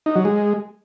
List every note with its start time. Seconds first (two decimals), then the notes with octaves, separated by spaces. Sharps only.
0.06 D#4
0.16 F#3
0.25 G#3